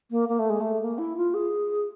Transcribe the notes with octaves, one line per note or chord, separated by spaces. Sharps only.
A#3
A#3
A3
G#3
A3
A#3
E4
F4
G#4